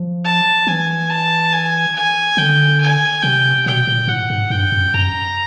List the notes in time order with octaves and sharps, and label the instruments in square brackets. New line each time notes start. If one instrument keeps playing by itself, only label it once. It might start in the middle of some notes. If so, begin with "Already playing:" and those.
Already playing: [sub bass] F3
[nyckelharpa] A5
[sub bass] E3 [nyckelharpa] G#5
[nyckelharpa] A5
G#5
G#5
[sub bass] D3 [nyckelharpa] G5
[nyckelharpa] G#5
[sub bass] C3 [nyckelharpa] G5
[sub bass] B2 [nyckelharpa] G5
[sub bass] A#2
[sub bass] A2 [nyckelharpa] F#5
[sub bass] G#2
[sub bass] G2 [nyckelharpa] G5
[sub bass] F#2
[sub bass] F#2 [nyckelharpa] A#5